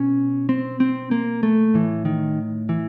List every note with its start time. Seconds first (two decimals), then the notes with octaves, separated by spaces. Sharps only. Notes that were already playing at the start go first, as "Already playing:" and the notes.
Already playing: B2 C#4
0.49 C4
0.80 C4
1.11 A#3
1.43 A3
1.74 A2 E3
2.05 D#3
2.69 E3